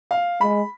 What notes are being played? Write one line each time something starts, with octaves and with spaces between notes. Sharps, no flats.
F5
G#3 B5